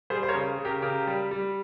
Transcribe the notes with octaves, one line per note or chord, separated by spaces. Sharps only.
G3 G#4 C5
C5
A#4 C#5
C#3
C#3
G4 A#4
C#3 G4 A#4
G3
G3